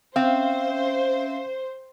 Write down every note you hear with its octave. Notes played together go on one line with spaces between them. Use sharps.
C4 C#4 C5 E5 F5